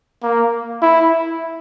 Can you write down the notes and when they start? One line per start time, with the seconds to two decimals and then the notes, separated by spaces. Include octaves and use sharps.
0.23 A#3
0.82 E4